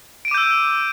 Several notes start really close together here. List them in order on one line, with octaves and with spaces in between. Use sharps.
D7 D#7 D6 G6 E6